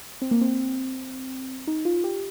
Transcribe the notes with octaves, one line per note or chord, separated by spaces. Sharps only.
C4
A#3
C4
D#4
F4
G4